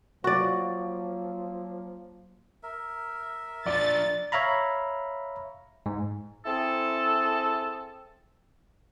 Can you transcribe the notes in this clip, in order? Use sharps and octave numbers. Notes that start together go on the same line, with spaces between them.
F3 F#3 A#3 F#4 D5
A#4 E5
F3 D4 D5 A6
C#5 E5 F5 A#5 B5
G#2
C4 E4 G#4 A4